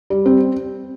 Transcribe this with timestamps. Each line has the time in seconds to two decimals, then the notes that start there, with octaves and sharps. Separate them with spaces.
0.10 G3
0.26 C4